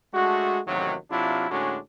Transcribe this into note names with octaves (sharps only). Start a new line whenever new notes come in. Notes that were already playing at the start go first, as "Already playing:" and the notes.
G#3 A3 D4 F#4
A1 D#2 C3 D#3 F#3
C3 F#3 D4 E4 F4
A2 D3 G#3 C#4 D4 F#4